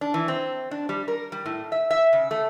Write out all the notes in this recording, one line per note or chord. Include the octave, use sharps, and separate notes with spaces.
D4
E3
C4
D4
G3
A#4
G3
A2
E5
E5
C#3
A3